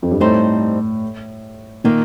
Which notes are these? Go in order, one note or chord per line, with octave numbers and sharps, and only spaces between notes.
F2
G2
A2 G3 C4 D#4 A4 C5
A#2 D#3 A#3 F4